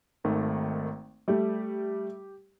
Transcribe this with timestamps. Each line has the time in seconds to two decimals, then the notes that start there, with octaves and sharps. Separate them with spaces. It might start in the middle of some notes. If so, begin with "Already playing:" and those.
0.24 G#1 D#3 A3
1.28 G3 A3 G4